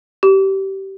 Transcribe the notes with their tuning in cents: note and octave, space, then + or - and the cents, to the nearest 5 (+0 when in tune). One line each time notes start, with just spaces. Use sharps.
G4 -20